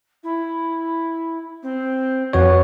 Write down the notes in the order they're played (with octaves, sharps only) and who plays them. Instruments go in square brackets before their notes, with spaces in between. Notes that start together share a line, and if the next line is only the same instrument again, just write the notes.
[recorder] E4
C4
[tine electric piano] F2 F#4 C#5 [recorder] B4